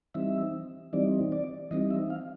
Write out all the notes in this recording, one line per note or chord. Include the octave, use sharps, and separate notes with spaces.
E3 G3 C4 D#4 E5
E3 G3 C4 D#4 D5
D5
E3 G3 C4 D#4 D#5
E5
F5